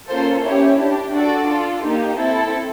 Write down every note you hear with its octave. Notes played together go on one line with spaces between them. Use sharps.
A#3 C#4 F4 A4 C5
C#4 E4 G4 C#5
D4 G4
D4 F#4 A4 D5
D4 F4 A4
A#3 D#4 G4
C4 E4 A4